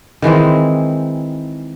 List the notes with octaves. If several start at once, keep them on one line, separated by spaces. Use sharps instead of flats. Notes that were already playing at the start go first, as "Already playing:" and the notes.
D#3 E3 G#3 C4